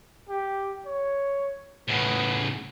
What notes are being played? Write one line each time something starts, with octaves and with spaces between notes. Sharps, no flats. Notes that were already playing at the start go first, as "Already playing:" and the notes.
G4
C#5
A2 C#3 B3